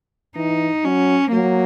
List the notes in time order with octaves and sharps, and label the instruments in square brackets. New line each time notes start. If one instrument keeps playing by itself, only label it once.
[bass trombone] E3 [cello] D#4
[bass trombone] F#3 [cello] C#4
[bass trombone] F#3 [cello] A#3